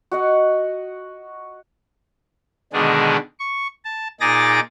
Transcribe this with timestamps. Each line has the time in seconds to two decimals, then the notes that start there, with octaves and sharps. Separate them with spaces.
0.11 F#4 D#5 F#5
2.73 B2 D3 D#3 G#3 D4 G#4
3.39 C#6
3.85 A5
4.20 A#2 D#4 G#4 D6 A6 A#6